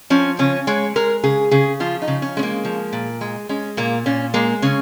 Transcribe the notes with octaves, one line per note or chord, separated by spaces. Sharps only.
F3 C#4
C#3 C#4
G#3 C#5
G#3 A#4
C#3 G#4
C#3 G#4
F3 F4
D#4
C#3
C#4
G#3 C#4
A#3
F3
A#2
G#3
G#3 C#4
A#2 A#3
A#2 C#4
G#3 A#3
C#3 C#4